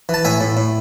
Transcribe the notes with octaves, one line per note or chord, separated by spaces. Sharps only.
E3 A5
A2 E5 G#5
A2
A2